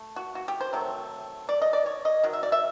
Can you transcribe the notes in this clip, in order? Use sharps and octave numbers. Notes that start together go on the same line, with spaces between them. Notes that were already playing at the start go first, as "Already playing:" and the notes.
Already playing: A3
F#4
F#4
G4
C5
C3 D#3 F#3 A3
D5
D#5
D5
C#5
D#5
D#3 F#3
E5
D5
E5